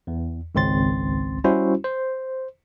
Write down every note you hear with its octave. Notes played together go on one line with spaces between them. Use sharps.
E2
G#1 C#2 C4 C6 A6
G3 C#4 E4 F#4 C5
C5